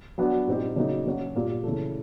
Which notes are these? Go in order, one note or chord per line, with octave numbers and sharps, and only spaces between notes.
F#3 B3 D4 F#4
A#2 G3 C4 D#4 G4
C#3 F#3 A#3 D#4
F#3 A#3 C#4 F#4
A#2 G3 A#3
C#3 E3 A3